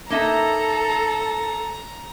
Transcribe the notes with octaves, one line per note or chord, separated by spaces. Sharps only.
A#3 D#4 A4 E5 A#5